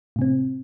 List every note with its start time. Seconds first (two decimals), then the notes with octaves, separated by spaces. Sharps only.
0.16 A2
0.19 C3
0.22 C4